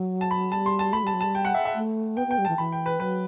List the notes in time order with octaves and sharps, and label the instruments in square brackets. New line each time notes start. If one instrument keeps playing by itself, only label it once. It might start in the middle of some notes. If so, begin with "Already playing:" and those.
Already playing: [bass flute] F#3
[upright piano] A5
B5
[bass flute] G3 [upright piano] A5
[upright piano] C6
A5
[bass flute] A3 [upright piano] B5
[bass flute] G3 [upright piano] A5
[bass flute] F#3
[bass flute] G3 [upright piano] A5
[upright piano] G5
F#5
E5
E5
[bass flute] A3
[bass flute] B3 [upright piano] G5
[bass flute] B3 [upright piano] G5
[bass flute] G3
[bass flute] E3 [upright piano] A5
[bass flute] E3 [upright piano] B5
[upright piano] G5
B4
[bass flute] F#3 [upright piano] B4